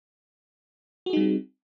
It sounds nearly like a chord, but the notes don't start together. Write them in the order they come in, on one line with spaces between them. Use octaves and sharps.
F#4 G#4 D#4 G3 C4